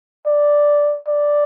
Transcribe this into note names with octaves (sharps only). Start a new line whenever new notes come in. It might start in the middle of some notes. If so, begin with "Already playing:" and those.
D5
D5